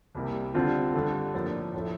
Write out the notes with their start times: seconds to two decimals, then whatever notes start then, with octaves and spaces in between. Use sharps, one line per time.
0.15 C2 C3 G3 A#3 E4
0.54 D3 G3 C4 F4
0.94 G2 D3 A3
1.33 A2 F3 A#3 D4
1.74 A2 F3 A3 E4